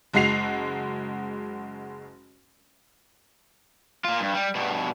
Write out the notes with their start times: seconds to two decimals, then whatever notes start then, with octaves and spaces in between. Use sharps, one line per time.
0.14 F#1 G#3 F#4 C7 F7
4.04 A#3 F4
4.20 G2
4.34 G3
4.55 G2 B2